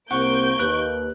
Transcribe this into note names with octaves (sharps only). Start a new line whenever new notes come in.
C2 A#3 C4 F#5 C#6 G6 D7
D#2 B4 F#6